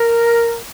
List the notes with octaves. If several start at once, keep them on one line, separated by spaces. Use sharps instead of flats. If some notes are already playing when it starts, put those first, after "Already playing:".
Already playing: A#4